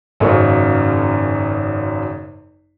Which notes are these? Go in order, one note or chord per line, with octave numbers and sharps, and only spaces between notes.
G#1 F#2 C#3 G#3 A#3 C#6